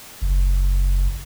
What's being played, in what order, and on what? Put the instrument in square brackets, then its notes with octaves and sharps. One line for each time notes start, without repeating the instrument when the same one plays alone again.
[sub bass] F#1